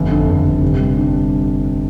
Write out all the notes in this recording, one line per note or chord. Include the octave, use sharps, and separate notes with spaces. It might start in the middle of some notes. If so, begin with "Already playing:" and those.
Already playing: G1 F2
D3
G1
G1
C3
G3
D4